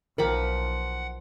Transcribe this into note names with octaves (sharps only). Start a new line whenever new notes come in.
B1 F3 A#4 F#5 G5 A#5 B5 D6